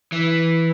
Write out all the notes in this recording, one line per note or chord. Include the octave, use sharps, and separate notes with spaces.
E3